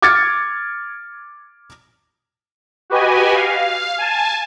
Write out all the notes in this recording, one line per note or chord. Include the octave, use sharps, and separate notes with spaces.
D6 F6 G#6 A6 C#7
F#4 G4 B4 D#5 G#5
F5
G#5 A5